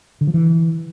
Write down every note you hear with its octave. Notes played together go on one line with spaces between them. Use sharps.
D3
F3
E3